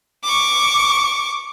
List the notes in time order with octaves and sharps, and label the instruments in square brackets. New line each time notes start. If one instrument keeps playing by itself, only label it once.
[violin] C#6 D6